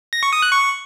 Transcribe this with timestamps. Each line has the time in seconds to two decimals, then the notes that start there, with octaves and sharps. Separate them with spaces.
0.13 A#6
0.23 C#6
0.33 D#6
0.42 F#6
0.52 C#6